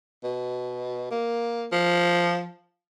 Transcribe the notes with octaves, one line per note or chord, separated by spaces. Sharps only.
B2
A#3
F3